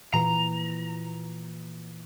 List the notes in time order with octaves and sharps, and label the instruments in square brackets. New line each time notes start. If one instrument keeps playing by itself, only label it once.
[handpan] A#2 E3 B4 [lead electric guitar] A#5